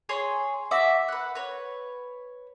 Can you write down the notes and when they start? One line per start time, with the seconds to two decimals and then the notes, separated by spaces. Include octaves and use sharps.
0.09 G#4 C#5 C6
0.71 F#4 D5 E5
1.08 B4 F#5
1.35 B4 C#5